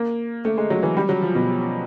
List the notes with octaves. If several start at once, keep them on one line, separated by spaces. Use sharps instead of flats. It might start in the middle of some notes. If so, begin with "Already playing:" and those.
Already playing: A#3
A3
G#3
F#3
E3
G3
F#3
F3
B2